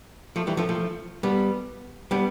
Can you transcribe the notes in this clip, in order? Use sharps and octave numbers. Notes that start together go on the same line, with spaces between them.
F3 A3
E3 G3
F3 A3
F3 A3
G3 B3
G3 B3